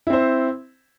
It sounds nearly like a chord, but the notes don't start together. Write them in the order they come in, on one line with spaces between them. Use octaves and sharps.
E4 C4 C5